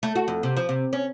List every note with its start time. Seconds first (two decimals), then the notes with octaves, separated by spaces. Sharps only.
0.03 A3
0.15 F#4
0.28 F2
0.43 C3
0.57 F3
0.69 C3
0.93 C#4